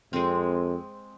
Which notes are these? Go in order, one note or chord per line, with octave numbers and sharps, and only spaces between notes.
F2 G#3 C4